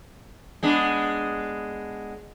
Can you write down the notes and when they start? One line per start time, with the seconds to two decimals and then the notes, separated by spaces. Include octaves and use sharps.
0.63 G#3 B3 D4